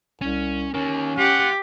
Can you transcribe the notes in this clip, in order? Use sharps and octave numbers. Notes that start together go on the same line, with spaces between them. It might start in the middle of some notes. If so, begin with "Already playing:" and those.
C2 C#4
D#3 A#3 C#4
F4 G4 F#5